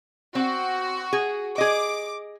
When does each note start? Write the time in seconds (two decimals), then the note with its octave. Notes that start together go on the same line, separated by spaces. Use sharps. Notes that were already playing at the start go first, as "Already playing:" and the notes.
0.35 C4 F#4
1.13 G#4
1.58 G#4 D#5 D6